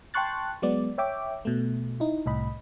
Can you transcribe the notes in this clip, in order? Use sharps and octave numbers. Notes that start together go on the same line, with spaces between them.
G5 A5 C6 C#6 F#6 A6
F#3 G#3 B3 D5
C#5 E5 G5 D6
B2 A3
D#4 E4
C2 A2 D#5 B5